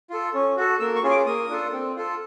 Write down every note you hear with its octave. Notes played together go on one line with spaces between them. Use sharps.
F4 A4
C#4
F#4 A4
A#3 E6
C#6
C#4 F4 G#4
D6
A#3 D#6
D4 F4 A4
C4
F4 A4